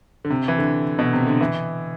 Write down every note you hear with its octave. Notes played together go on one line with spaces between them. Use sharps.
D3
C3
E3
D3
B2
C3
D3
E3